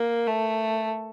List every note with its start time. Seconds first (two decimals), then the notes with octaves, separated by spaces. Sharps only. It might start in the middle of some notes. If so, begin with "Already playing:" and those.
Already playing: A#3
0.26 A3